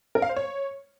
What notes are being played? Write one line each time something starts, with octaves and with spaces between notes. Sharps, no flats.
A#4
F5
C5
C#5